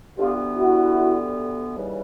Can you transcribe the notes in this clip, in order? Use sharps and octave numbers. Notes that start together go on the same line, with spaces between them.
D2 D3 G3 B3 F4 G4
E4 F#4
D#2 C#3 E3 G3